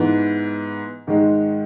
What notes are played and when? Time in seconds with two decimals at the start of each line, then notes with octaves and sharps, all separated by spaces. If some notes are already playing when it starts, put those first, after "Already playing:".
Already playing: G#2 E3 B3
1.07 G#2 D#3 G#3